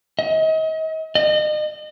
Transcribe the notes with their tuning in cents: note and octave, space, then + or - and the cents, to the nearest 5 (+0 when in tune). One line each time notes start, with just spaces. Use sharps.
D#5 +35
D#5 -35